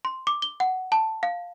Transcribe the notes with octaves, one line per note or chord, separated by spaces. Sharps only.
C6
D6
G7
F#5
A5
F5